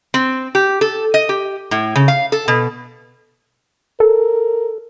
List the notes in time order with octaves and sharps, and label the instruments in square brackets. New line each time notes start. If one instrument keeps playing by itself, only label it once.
[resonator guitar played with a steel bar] C4
G4
A4
D#5
G4
A2
C#3
F5
A4
B2
[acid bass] A4 [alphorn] A#4